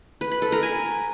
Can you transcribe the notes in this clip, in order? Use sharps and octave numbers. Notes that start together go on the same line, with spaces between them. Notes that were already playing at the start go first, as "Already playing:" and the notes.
B4
B5
A4
A#4
G#5